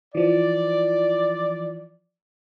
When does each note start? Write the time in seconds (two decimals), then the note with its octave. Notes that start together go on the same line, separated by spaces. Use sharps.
0.15 E3 F3 D5